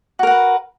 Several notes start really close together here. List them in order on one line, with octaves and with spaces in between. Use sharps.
F#4 A#4 F#5 B4